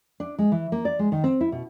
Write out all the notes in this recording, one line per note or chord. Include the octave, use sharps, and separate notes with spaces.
D4
G#3
E3
A#3
D5
G#3
D#3
C4
E4
B2